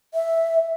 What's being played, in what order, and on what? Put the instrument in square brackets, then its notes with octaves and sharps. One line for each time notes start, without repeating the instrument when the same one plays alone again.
[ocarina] E5